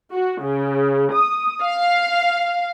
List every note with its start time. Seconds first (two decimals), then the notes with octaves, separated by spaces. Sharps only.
0.12 F#4
0.42 C#3
1.13 D#6
1.64 F5